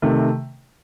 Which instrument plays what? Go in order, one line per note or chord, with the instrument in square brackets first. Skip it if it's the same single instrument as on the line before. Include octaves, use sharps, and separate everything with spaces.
[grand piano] C3 D#3 A3